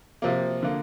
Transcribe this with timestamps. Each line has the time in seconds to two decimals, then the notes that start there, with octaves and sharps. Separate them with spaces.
0.22 C3 F3 A#3
0.63 D3 A#3